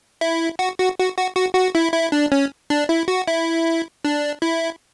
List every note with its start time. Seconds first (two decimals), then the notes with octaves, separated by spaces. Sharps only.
0.21 E4
0.59 F#4
0.79 F#4
0.99 F#4
1.17 F#4
1.36 F#4
1.55 F#4
1.75 E4
1.94 E4
2.12 D4
2.32 C#4
2.70 D4
2.89 E4
3.08 F#4
3.28 E4
4.05 D4
4.42 E4